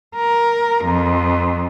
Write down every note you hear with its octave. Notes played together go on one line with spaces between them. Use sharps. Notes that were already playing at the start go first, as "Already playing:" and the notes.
A#4
F2